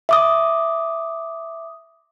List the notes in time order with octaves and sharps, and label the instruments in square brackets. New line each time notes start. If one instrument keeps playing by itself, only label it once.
[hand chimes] E5 D6 D#6